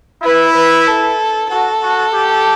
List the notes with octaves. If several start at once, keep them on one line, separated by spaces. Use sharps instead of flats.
E4 B4
B4
A4
F#4 A4
F#4
G4